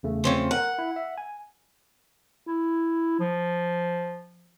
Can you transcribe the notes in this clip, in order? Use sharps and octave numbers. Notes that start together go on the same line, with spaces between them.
E2 C#3 A3
F3 C4 C#4
A#4 F#5
E4
E5
G#5
E4
F3